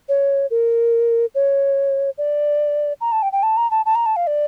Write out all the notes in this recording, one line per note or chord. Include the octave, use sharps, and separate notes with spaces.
C#5
A#4
C#5
D5
A#5
A5
G5
G5
A5
A#5
A5
A5
A#5
A5
F5
D5